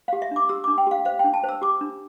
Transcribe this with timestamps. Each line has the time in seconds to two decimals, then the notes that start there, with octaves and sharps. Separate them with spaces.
0.08 G4 F5
0.22 E5
0.31 D4 D6
0.49 G4 E6
0.64 D4 D6
0.78 G5
0.87 G4 F5
1.05 C5 F5
1.19 D4 G5
1.34 A5
1.44 C5
1.49 E6
1.62 G4 D6
1.81 D4